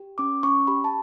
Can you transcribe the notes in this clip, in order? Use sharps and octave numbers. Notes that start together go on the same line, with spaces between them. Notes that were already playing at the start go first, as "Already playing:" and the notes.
Already playing: G4
C#4 D6
C#4 C#6
G4 B5
A5